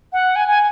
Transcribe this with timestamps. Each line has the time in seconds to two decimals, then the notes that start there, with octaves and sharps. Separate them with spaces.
0.13 F#5
0.36 G#5
0.48 G#5